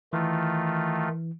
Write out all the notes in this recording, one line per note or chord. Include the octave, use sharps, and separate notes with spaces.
D#3 E3 A3 F4